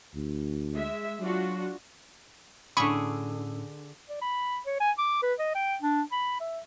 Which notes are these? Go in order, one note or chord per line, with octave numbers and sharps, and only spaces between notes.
D2
G#3 E5
F#3 D4 F4 F#4
A2 D3 C#4 G#4 B5 C#6 E6
D5
B5
C#5
G#5
D6
B4
D#5
G5
D4
B5
E5